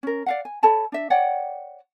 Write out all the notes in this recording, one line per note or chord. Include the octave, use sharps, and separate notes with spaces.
C#4 A#4
D5 F5 F#5
G#5
A4 C#5 A5 B5
D4 E5
C#5 D5 F#5 G5